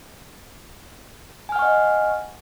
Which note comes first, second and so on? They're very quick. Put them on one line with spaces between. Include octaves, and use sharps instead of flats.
G#5 F6 F#5 C#6 D#5